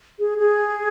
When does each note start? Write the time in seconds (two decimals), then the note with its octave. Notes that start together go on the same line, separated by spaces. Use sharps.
0.19 G#4
0.38 G#4